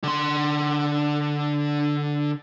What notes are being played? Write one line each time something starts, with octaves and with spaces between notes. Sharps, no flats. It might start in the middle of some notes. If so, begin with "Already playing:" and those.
D3 C6